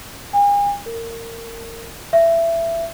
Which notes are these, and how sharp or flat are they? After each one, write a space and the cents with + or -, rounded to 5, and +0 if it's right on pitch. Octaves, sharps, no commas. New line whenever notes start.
G#5 -40
A#4 -25
E5 +20